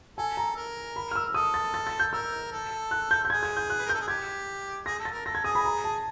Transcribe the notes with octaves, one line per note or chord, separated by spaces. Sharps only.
A4 G#5
A#5
A#4
B5
F6
E6
A4 D#6
A6
A6
A6
G6
A#4 E6
A4
F#6
G6
G6
G#4 G#6
G#6
G6
F#6
B4
A#4
A4 G6
G#4
G4 G#6
G#4 A#6
A4
A6
A#4
A4 A#6
G#6
G#4 D#6
B5
A#5
A5